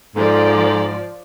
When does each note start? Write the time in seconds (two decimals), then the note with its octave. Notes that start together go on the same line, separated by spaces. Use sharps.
0.16 G#2 F3 A4 D5